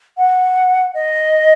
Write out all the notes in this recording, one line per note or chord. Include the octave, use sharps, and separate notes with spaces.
F#5
D#5